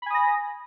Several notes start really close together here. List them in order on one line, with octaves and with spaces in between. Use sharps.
B5 G#5 D#6 A#6